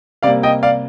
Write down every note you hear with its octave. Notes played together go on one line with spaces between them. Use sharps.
C3 G3 A#3 D5 F5
D#5 G5
D5 F5